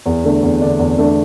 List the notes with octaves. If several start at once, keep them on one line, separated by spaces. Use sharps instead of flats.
E2
D3 A3 D4
E2
D3 A3 D4
E2
D3 A3 D4